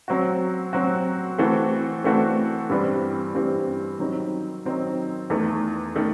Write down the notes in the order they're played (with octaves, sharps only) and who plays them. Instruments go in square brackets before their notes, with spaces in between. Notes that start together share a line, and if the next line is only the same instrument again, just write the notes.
[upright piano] F#3 C4 F#4
F#3 C4 F#4
E3 A3 C4 F#4 A4
E3 A3 C4 F#4 A4
G2 E3 G3 C4
G2 E3 G3 C4
D#3 F#3 C4 D#4
D#3 F#3 C4 D#4
E2 D#3 A3
D#3 A3